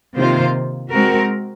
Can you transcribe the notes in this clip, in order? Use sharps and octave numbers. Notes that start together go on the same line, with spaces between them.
C3 D#3 A#3 F4 C5
G#3 C4 F#4 A#4